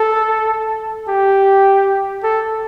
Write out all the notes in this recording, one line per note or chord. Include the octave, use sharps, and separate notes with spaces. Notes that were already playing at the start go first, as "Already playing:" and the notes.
Already playing: A4
G4
A4